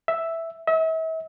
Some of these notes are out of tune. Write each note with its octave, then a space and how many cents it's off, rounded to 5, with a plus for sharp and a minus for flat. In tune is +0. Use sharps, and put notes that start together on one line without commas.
E5 +0
E5 -40